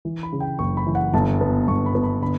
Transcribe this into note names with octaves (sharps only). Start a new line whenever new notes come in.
E3
B5
C#3
G5
F#1 C#6
B5
E3
F#5
G1 A5
B3
G1 C#6
B5
B3
B5
D3 B5